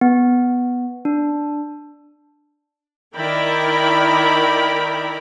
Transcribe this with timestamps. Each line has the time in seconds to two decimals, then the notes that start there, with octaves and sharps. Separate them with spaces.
0.01 B3
1.05 D4
3.16 D#3 E4 A#4 D5 G5 B5